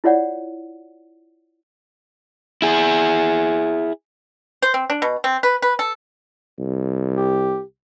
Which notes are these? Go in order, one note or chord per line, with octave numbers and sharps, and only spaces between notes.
E4 F4 C#5 D5 F#5
E4 G#4
C5
C4
D4
B2
C4
B4
B4
A4
C2
G4